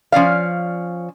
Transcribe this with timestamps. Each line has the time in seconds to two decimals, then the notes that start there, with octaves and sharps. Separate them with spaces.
0.12 F3 C#4 D5 F5